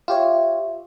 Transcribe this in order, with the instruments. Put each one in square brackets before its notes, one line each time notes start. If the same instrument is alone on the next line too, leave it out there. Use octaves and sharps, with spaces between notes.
[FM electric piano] F4 G4 C#5 [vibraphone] E5